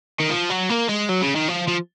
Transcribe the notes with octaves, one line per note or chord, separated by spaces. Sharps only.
D#3
F3
F#3
A#3
G#3
F#3
C#3
D#3
F3
F3